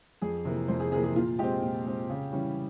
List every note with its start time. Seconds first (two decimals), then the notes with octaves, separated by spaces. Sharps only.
0.22 F2 G#4
0.45 C3 E3 A#3
0.68 F2 C5
0.80 G#4
0.92 C3 E3 A#3 G#4
1.03 G#4
1.16 A#2 F4
1.39 G#3 C4 G4
1.62 A#2
1.86 G#3 C4
2.09 C#3
2.32 E3 G3 C#4